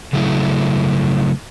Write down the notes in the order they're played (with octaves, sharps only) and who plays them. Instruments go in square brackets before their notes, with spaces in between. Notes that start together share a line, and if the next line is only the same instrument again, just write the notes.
[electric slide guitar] C#3 F#3 A3 E4